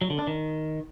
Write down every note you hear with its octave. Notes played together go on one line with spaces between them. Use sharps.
F#3
D3
D4
D#3